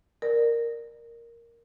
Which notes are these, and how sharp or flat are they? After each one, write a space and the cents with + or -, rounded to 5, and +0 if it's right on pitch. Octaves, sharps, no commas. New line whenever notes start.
A#4 +0 D5 +30